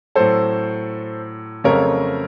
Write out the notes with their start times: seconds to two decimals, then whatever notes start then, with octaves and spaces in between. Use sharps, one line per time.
0.15 A2 F#3 C4 A4 C5
1.64 F2 C#3 F#3 A3 C4 A#4 C#5